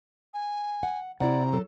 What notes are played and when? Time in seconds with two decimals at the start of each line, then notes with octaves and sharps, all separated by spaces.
0.34 G#5
0.83 F#5
1.20 C3 E4 D5 F#5 A#5
1.53 F#3 A4